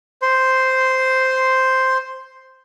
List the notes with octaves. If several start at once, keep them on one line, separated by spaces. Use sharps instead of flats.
C5 C6